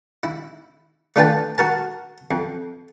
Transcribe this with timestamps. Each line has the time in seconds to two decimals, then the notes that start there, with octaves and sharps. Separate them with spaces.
0.23 E4
1.16 A3 D4 F4 B4 G5 A5
1.58 F#4 A#4 A5
2.31 F2